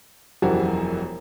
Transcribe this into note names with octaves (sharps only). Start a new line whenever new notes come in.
E1 F#2 E3 F3 F#4 G4